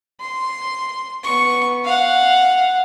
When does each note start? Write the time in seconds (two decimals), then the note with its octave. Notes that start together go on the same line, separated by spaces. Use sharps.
0.20 C6
1.24 B3 C#6
1.85 F5 F#5